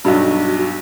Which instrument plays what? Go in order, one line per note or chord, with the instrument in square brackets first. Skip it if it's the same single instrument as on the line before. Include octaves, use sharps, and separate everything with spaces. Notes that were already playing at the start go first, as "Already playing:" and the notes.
[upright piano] B1 G2 [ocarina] F#4